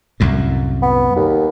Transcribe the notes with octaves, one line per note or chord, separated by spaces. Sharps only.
C2 F#2 A2
B3
D#2